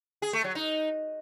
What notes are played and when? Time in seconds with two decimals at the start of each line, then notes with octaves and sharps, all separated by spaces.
0.22 G#4
0.33 A3
0.44 F#3
0.55 D#4